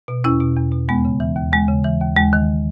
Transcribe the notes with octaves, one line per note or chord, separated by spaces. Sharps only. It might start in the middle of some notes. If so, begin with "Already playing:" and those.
B2
E2 C#4 E4
B2
E2
B2
D#2 G#3 B3
C#3
E3
D#2
D#2 G#3
C#3
E3
D#2
D#2 G#3
D#3